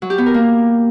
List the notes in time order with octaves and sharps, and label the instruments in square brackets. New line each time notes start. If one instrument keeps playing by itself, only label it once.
[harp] F#3
G4
B3
A#4
A#3